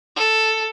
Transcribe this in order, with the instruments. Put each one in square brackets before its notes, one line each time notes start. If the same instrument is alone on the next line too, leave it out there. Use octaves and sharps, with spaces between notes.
[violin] A4